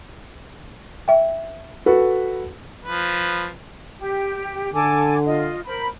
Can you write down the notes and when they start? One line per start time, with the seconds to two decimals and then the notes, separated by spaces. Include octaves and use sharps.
1.08 E5 G5
1.86 F#4 A4 B4
2.85 F3 B4
3.99 G4
4.73 D3 A4 G#5 D6
5.26 F4 D#5
5.66 A#4 C5 B5